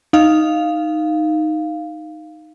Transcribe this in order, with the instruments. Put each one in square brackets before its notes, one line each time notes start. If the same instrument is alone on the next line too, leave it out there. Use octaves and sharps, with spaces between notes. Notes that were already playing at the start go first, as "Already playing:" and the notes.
[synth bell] D#4 F5